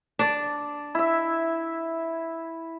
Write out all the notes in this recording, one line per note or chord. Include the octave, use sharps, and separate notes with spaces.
D4 D5
E4 E5